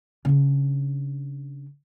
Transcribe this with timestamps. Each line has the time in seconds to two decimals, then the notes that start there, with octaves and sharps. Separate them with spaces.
0.25 C#3 D4